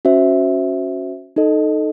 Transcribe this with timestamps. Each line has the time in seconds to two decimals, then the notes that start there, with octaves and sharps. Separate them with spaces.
0.05 C#4 F#4 C5 E5
1.36 D#4 A4 D#5